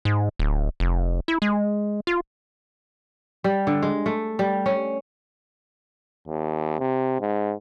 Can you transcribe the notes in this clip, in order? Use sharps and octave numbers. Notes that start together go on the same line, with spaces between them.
G#2
D1
F1
E4
G#3
F4
G3
D3
G#3
A3
G3
C#4
D#2
C3
G#2